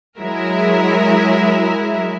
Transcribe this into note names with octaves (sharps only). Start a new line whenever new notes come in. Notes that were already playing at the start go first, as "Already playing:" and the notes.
F#3 G#3 E4 A#4 E5